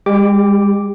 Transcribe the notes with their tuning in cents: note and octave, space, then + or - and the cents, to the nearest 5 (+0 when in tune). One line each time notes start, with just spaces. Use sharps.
G#3 -40 G4 +0 D6 +0